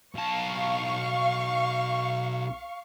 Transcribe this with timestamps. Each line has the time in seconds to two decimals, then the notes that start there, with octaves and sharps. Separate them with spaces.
0.15 B1 F5 A5 C#6